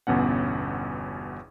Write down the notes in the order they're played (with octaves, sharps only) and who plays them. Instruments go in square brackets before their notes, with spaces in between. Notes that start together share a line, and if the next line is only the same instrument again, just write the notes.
[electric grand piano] G1 E2 B2 C#4 F#5